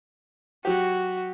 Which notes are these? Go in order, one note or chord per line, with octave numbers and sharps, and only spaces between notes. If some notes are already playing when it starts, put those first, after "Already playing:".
F#3 F#4 G4